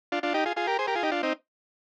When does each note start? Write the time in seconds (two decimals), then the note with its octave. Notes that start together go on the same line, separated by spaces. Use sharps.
0.12 D4 F4
0.23 D4 F4
0.34 D#4 G4
0.46 F4 G#4
0.56 F4 G#4
0.67 G4 A#4
0.79 G#4 C5
0.87 G4 A#4
0.95 F4 G#4
1.03 D#4 G4
1.12 D4 F4
1.23 C4 D#4